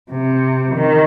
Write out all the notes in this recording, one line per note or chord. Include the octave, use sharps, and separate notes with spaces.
C3
D#3